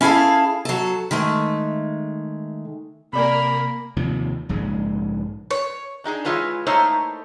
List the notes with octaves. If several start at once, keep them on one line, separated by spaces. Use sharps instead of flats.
C#4 E4 G#4 A4 F5
F#3 A4
D#3 G#3 A3
C3 A#3 A#4 D5 G#5 B5
D#2 C3 F3
A#1 G#2 C#3 G#3
C#5
D4 D#4 G4 G#4
E3 G#3 F4 B4 C#5
A3 A#3 D#4 E4 C5 C#5